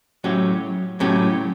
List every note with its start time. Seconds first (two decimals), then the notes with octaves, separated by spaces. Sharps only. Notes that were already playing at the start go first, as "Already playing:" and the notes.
0.24 A2 F#3 C#4 G4
1.00 A2 F#3 C#4 G4